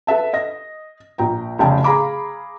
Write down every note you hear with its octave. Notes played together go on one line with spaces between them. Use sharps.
A4 B4 E5 A5
D#5 A#6
A#1 G5 A#5
F1 C#3 G5 A5
G#4 F5 A#5 B5 D6